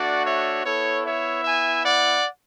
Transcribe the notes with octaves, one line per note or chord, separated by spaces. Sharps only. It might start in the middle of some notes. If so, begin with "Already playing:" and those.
Already playing: A3 D4 F#4 D5 F#5
C#5 E5
B3 E4 A4 C#5
C#5 E5
E5 G#5
D5 F#5